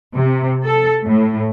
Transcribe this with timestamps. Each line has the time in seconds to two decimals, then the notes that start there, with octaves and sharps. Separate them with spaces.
0.17 C3
0.65 A4
1.05 A2